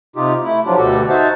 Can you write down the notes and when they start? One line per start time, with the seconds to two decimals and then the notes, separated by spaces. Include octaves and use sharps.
0.16 C3 D#4 F4 G4
0.44 A3 E4
0.66 F3 F#3 D4 F4 G4
0.78 D2 B2 F#4 G4 A4
1.09 D#4 F#4 C5 E5 F#5 A5